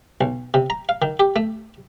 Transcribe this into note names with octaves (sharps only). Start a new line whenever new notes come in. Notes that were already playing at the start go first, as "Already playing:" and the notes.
B1
C3
A#5
F5
D#3
G4
A3